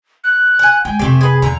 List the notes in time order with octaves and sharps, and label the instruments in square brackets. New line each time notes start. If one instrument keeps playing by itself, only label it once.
[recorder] F#6
[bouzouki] F#5 G#5
[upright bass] G#3 [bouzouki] G5 [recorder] G#5
[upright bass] F2 C3 [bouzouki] A3 C4 G4
[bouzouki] G#4 B4
[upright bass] E2 [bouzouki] D3 A#5 [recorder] G#5